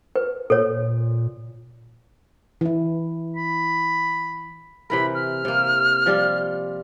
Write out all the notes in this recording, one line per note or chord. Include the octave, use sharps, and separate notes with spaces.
B4
A#2 A4 C#5
E3 E4
B5
C3 E3 A#4 B5
F6
C3 A#3
F3 G3 G4